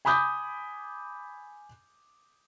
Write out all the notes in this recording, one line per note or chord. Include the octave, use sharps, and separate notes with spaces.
G#5 B5 D6 D#6 G6